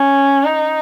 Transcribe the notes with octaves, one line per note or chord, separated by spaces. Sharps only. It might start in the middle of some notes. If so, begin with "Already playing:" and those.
Already playing: C#4
D#4